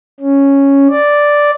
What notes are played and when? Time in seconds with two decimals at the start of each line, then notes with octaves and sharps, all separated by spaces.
0.20 C#4
0.90 D5